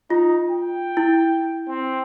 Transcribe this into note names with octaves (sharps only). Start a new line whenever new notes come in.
D#4 F4
G5
E4
C4